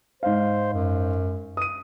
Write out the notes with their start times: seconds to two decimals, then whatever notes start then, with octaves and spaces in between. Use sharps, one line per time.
0.23 G#2 C5 F5
0.74 F#2
1.57 D#6 D#7